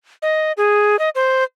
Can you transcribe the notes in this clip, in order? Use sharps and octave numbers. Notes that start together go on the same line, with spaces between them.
D#5
G#4
D#5
C5